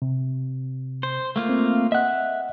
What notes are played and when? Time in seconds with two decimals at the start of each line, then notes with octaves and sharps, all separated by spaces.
0.02 C3
1.03 C5
1.36 A3 A#3 F4
1.49 C4
1.92 D#5 E5 F#5 F#6